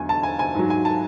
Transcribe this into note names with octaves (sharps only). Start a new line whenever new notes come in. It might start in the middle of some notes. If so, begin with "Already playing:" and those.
Already playing: E2 D3 F#3 G#5
A5
G#5
G#5
G#2 F#3
G#5
A5